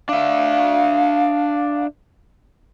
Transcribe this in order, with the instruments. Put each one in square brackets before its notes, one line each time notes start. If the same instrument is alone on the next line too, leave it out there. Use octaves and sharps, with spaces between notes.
[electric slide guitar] D4 E5 [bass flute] F5